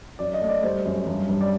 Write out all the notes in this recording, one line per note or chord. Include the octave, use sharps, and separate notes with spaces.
F#2 D5
D#5
A3
D5
G3 C5
F#2
G2
G2
D5